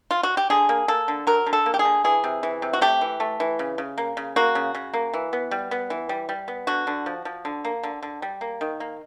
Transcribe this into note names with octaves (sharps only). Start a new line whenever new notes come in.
F4
F#4
G4
D3 G#4
A#3
A#3 A4
D3
F#3 A#4
D3
A4
A#3
G4
G#4
D3
E3 G#4
C3
E3
C3
F#4
A3 G4
E3
A3
E3
C#3
C#3
A#3
C#3
A#3 F#4
C#3
C#3
A#3
E3
B3
G3
B3
E3
G3
G3
B3
D3 F#4
D3
F3
F3
D3
A#3
D3
D3
G3
A#3
D#3
A#3